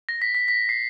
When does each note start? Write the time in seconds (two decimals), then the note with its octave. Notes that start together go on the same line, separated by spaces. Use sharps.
0.09 A#6
0.22 B6
0.35 B6
0.48 B6
0.69 C7